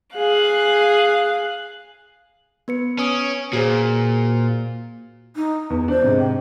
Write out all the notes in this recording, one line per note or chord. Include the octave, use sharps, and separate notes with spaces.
G#4 F5 F#6
B3 B4 C#7
C#4 B4 D#6 D7
A#2 F#4 G#4 C5
D#4
E2
D4 C5
G#2 C3
G5